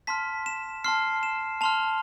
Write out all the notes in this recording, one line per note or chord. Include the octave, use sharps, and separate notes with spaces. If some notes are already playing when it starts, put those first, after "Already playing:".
A5 C6 F6 B6
E7
A5 C6 F6 C7
E7
A5 C6 F6 F7